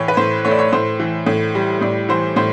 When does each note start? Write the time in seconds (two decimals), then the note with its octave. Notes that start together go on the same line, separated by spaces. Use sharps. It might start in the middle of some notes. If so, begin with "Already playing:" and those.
Already playing: A2 E3 C#5
0.08 B4
0.17 A2 C5
0.45 A3 C#5
0.51 D5
0.59 C#5
0.73 A2 C5
1.00 E3
1.26 A2
1.55 G3
1.81 A2 D5
2.09 E3 C5
2.36 A2 C5